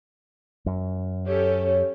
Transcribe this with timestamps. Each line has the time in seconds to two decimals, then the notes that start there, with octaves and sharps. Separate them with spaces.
0.66 F#2
1.27 C#4 G4 A4 C#5